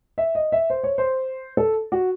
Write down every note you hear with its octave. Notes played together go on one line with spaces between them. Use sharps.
E5
D#5
E5
C5
C#5
C5
A4
F#4